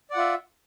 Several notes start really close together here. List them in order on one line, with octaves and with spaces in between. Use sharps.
D5 F#5 F4 E5